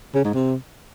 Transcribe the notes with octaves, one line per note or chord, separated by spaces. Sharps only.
C#3
G#2
C3